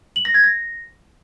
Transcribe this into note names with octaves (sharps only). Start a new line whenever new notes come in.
F#7
A#6
G#6
A#6